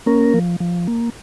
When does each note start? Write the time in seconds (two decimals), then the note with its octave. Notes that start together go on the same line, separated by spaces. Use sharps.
0.06 A#3 C#4 A#4
0.34 F3
0.60 F3
0.87 A#3